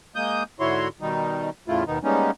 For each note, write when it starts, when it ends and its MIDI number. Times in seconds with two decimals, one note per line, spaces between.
0.15 0.43 56
0.15 0.43 58
0.15 0.43 87
0.15 0.43 91
0.60 0.88 44
0.60 0.88 50
0.60 0.88 64
0.60 0.88 66
0.60 0.88 73
0.60 0.88 84
1.01 1.50 47
1.01 1.50 51
1.01 1.50 55
1.01 1.50 63
1.68 1.84 40
1.68 1.84 45
1.68 1.84 49
1.68 1.84 57
1.68 1.84 64
1.68 1.84 65
1.87 1.99 39
1.87 1.99 47
1.87 1.99 51
1.87 1.99 59
1.87 1.99 63
2.03 2.31 55
2.03 2.31 56
2.03 2.31 58
2.03 2.31 59
2.03 2.31 61
2.03 2.31 63